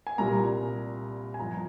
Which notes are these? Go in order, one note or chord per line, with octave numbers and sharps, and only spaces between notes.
G#5
C2 A#2 G3 A#5
G#5
G1 G2 F3 A#5
G#5